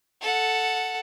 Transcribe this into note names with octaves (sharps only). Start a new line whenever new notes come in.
A4 F#5